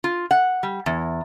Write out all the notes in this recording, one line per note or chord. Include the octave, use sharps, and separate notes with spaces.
F4
F#5
G3
E2